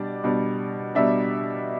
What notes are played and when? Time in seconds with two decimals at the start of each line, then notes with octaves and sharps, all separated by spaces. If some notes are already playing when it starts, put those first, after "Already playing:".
Already playing: B2 G3 D4 D5
0.24 B2 G3 D4
0.95 B2 G3 D4 E5